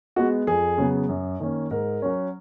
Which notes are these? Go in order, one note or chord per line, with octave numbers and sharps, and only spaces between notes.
G#3 B3 F#4
F2 G#4
C#3 F#3 B3
F#2
D#3 A#3 C#4
G#2 A#4
F#3 C#4